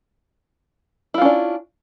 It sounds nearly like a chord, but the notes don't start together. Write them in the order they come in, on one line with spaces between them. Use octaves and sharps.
E4 F4 C#4 D4